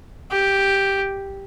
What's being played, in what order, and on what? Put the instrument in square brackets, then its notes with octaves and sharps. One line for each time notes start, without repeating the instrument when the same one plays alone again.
[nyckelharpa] G4